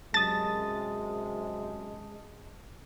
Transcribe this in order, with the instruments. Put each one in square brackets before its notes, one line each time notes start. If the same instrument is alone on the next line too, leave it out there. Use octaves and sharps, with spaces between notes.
[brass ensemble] F#2 C3 [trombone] G#3 [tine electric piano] A5 D#6 [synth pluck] A6